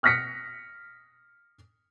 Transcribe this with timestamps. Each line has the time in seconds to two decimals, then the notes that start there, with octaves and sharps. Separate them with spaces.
0.03 D#6 F6 F#6 A#6 B6 C#7